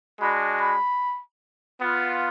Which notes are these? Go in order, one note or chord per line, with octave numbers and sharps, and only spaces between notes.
G#3 D4 F#4 B5
B5
B3 F4